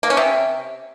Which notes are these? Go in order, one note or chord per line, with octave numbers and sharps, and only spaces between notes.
A#3
C#4
C3